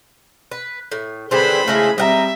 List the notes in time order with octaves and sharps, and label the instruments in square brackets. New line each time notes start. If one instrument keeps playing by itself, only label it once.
[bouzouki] B4
A2
[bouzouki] D3 G3 C4 [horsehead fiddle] G#4 B4 [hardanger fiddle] C5 B5
[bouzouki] C#3 G#3 E4 [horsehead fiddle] A3 G#4
[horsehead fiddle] G3 C4 [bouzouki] D#5 F#5 A#5 [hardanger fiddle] E5